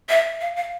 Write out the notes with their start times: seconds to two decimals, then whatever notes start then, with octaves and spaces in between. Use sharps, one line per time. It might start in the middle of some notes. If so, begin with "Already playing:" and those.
0.09 E5
0.41 F5
0.56 F5